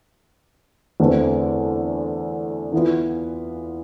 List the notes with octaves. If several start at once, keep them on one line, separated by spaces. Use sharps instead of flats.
E2 D3 A3 C4
E3 B3 F4